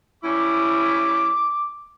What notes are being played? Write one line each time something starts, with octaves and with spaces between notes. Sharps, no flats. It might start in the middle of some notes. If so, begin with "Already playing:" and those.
G3 C#4 E4 D6